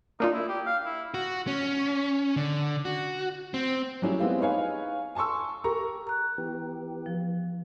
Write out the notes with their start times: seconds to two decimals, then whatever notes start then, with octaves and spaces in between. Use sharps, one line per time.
0.20 A#3 D4 D#4 F4
0.34 E4
0.48 G4
0.66 F5
0.85 E4
1.14 F#4
1.47 C#4
2.36 D3
2.85 F#4
3.54 C4
4.02 F#3 G3 C#4 E4 G#4
4.19 G#3 B3 C4 E4 F4 G4
4.40 D#4 B4 C#5 F5 G#5
5.15 G#5 A5 C6 C#6 E6
5.64 G4 A#4 A#5 C#6
6.07 A#5 F#6
6.38 E3 B3 G4
7.06 F3